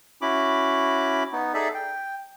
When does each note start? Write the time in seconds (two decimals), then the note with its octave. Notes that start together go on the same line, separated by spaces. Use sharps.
0.22 C#4 E4 F#4 B5 D6
1.33 B3 D#4
1.54 D#4 G#4 A4 D5 E5
1.75 G5